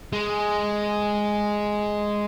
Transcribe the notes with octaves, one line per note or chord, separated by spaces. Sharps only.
G#3